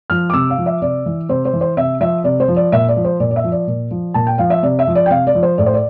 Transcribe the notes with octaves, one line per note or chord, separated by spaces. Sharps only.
F3 F6
D6
C3 E6
F5
F3
E5
C3 D5
E3
C3 C5
C5
E3
C5
C3 E5
F3 E5
C3 D5
C5
F3
D5
A#2 E5
D5
F3
C5
A#2 D5
D5
E5
F3
D5
A#2
F3
A#2 A5
G5
F3 F5
E5
C3 D5
E5
F3
D5
G5
C3 F5
D5
F3
C5
A2 D5
C5
D5